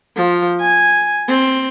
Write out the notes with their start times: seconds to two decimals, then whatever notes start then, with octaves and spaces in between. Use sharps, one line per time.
0.16 F3
0.61 G#5
1.28 C4